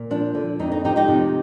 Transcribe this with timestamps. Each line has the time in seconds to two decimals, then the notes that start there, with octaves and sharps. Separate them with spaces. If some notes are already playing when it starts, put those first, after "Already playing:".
Already playing: A#2
0.10 F3 D4
0.34 D3
0.59 F2 D#4
0.72 D#4
0.84 F3 D#4 G4
0.96 D#4 G4
1.08 C3